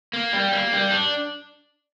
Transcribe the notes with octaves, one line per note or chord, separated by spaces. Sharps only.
A#3
G3
A#3
G3
D4